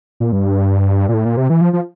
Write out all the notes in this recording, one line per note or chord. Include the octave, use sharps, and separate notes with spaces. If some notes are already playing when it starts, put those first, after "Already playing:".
A#2
G2
A#2
A2
A#2
C3
E3
F3
F3